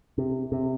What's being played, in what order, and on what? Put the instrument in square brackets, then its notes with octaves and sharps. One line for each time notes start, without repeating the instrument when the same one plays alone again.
[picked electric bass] C3
C3